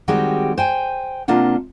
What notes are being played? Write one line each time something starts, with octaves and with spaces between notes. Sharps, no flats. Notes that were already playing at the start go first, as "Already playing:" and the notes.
D#3 G3 G#3 C4 F#4 G4
C5 G5 G#5
C3 A#3 D4 F4 F#5